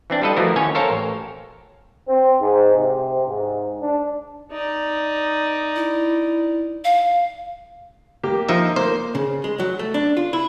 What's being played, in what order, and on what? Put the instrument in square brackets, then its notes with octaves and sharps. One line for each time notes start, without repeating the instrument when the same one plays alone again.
[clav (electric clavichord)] E3 C4 D4
G3 F4 A4 B4 D#5
E3 F3 A3 E4 F#4 A#4
D#2 D#3 C#4 C#5 G#5
A4 A#4 C5 C#5 F5
A1
[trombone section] C4
G#2
C3
G#2
D4
[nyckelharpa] D#4 D5
[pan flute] E4
F5
[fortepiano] A#3 G4
[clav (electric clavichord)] F3 D#4 E5
[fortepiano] A#3 [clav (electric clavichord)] C5
[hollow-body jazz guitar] C#3
G#3
F#3
A3
D4
F4
E4